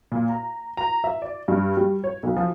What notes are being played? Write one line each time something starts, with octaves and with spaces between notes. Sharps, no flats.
A#2
A#5
A#5
E5
D5
G2
G3
C#5
B1
F3